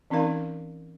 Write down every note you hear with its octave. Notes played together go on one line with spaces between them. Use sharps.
E3 C4 C#4 D#4 A#4 F5